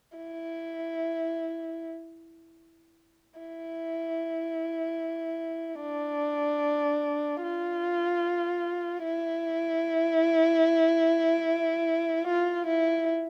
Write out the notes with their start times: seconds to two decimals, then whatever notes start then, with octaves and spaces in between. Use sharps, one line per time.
0.17 E4
3.39 E4
5.81 D4
7.43 F4
9.05 E4
12.27 F4
12.67 E4